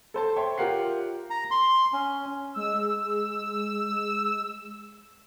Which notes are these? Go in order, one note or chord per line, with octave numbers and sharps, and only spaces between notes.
A4 C5 A5
C#5 E5 G5 C6
F4 G4 A#4 F#5 C7
A#5
C6
C#4
G#3 E6